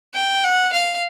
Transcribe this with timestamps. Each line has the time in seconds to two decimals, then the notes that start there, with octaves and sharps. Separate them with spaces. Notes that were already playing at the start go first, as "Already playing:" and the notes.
0.15 G5
0.44 F#5
0.73 F5